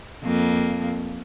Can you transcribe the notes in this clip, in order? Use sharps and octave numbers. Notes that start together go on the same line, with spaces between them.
F2 A#3